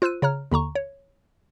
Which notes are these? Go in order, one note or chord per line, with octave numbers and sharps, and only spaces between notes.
F4 C5 E6 F#6 D#7
C#3 C#5 A#5 F6
D#2 D3 A#5 C#6
C#5